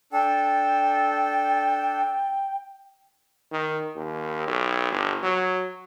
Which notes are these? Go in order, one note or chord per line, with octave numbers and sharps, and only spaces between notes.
D4 A4 G5
D#3
D#2
B1
G1
F#3